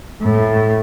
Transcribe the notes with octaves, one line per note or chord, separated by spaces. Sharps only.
A2